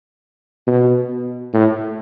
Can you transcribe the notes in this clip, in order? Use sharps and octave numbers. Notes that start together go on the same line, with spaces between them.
B2
A2